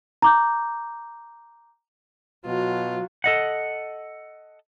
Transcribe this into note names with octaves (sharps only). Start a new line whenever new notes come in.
A#5 D6 G6
B2 F#3 F4
A4 D#5 F#5